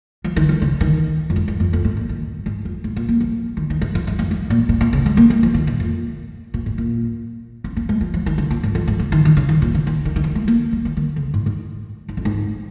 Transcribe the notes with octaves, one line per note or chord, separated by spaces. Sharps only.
F3
D#3
F3
C#3
D#3
F2
G#2
G#2
F2
F2
G#2
A#2
D#3
G#2
F2
G#2
A#2
A#3
F3
D#3
D#3
G#2
F2
G#2
F2
G#2
A#2
A#2
A#2
C#3
G#3
A#3
G#3
F3
D#3
A#2
F2
A#2
G#2
A#2
C#4
A#3
G#3
F3
F3
D#3
C#3
A#2
G#2
F2
G#2
C#3
D#3
D#3
C#3
D#3
A#2
C#3
D#3
D#3
D#3
F3
G#3
A#3
G#3
D#3
D#3
C#3
G#2
G#2
G#2
F2
G#2